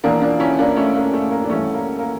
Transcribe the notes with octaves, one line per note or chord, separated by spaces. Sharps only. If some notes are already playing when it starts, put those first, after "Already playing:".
E1 E2 E3 A#3 D4
D4 F4
C#4 E4
A#3 D4
A3 C#4
A#3
A3
A#3
D4
A1 G2 E3 A3 C#4
A#3
A#3